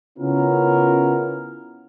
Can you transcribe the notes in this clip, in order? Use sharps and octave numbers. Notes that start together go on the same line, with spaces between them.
C#3 B3 C#4 E4 F4 A#4